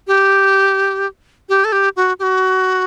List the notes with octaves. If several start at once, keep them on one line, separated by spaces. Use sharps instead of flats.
G4
G4
A4
G4
F#4
G4
F#4